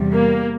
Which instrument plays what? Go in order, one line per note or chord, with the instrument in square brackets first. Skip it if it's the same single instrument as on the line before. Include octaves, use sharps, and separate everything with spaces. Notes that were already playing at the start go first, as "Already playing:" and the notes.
Already playing: [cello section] E2 C3 G3
[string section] A#3